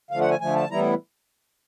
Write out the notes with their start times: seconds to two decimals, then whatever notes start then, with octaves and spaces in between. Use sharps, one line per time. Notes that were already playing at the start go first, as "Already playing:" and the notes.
0.11 D3 F3 A3 F5
0.21 F#5
0.30 G#5
0.41 D3 F3 A3 G#5
0.55 A5
0.70 A2 E3 G3 B3 E4 A#5